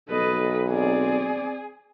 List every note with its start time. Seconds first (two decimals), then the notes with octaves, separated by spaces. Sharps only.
0.10 B1 A4 B4 D#5
0.70 C4 G#4 D5